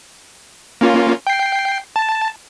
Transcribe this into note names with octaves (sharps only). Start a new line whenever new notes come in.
A#3 C#4 F4
G5 C7
A5